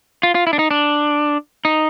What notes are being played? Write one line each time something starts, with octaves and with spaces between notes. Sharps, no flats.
F4
F4
E4
D4
D#4
D4
D#4